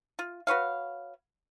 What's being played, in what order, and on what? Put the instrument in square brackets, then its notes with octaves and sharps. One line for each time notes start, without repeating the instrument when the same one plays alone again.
[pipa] F4
F#4 B4 C#5 F5